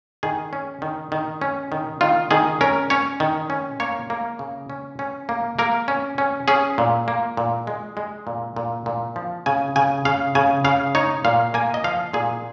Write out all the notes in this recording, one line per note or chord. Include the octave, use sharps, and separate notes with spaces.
D#3 G#4
C#4
D#3
D#3
C#4
D#3
D#3 F4
D#3 G#4
C#4 A#4
C#4 C#5
D#3
C#4
A#3 C#5
A#3
C#3
C#4
C#4
A#3
A#3 A#4
C#4
C#4
C#4 G#4
A#2
A#3
A#2
G#3
G#3
A#2
A#2
A#2
F3
C#3 G#5
C#3 G#5
C#3 F5
C#3 G#5
C#3 F5
D#4 C#5
A#2 F5
A#3 G#5
D#5
F3 F5
A#2 G#4